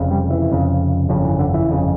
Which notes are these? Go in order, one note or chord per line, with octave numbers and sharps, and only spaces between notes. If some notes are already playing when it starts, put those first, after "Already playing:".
Already playing: F1 F2 C#3
G3
E3
F1 F2 C#3
G1 F2 C#3 F3
E3
D3
E3
G1 F2 C#3